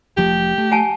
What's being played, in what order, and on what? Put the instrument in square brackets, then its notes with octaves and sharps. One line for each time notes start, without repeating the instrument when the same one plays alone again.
[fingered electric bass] F1 F3 A3 [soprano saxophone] G4
[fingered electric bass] A3
[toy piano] F#5 G#5 A5